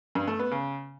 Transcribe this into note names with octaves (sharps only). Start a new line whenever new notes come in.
G2
A3
B3
C#3